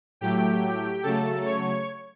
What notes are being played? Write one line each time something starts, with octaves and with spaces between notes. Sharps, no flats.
A2 F#3 A3 G4 G5
C#3 F#3 A3 A4 A5
C#5 C#6